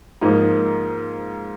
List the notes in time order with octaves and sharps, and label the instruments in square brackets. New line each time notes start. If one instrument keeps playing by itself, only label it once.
[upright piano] G#2 F3 A#3 D#4